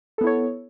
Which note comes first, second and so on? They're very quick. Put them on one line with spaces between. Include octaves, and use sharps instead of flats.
A4 B3 E4 C#5